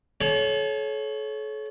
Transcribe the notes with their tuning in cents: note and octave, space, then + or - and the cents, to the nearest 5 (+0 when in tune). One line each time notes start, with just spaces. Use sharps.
A4 -40 C#5 +0